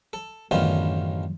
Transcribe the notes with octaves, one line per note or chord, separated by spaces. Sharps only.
A4
A1 F#2 D3 D#3 B3 F4